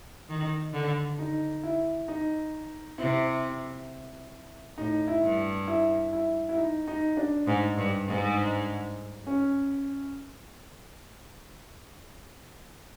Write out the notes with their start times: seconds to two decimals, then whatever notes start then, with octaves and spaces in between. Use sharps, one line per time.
0.29 D#3
0.73 D3
1.19 D#4
1.63 E4
2.08 D#4
2.98 C3 E4
4.78 A2 D#4
5.08 E4
5.22 G2
5.68 E4
6.13 E4
6.49 E4
6.57 D#4
6.88 D#4
7.17 D4
7.47 G#2
7.78 G2
8.08 G#2
9.27 C#4